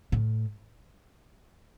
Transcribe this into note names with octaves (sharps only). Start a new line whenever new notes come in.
A2